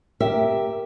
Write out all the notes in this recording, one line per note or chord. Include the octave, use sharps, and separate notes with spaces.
G4 A#4 E5